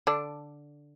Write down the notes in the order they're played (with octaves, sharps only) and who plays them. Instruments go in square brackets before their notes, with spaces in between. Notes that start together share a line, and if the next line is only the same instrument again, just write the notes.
[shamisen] D3 D4